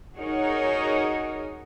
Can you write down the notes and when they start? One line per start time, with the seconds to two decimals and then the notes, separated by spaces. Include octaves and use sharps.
0.16 D#4 F#4 G#4 A#4 C#5 D#5